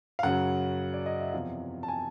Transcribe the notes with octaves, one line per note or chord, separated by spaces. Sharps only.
F5
F#2 C#3 F#3 F#5
D5
D#5
E5
E2 C3 F3 F5
A5
G#5